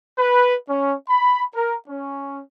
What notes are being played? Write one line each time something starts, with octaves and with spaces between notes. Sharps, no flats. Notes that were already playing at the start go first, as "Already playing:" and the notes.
B4
C#4
B5
A#4
C#4